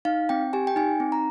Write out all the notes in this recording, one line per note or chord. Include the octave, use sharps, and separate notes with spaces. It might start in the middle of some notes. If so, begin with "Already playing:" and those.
D#4 F5
C4 G5
G4 G#5
G5
D#4 G#5
C4
A#5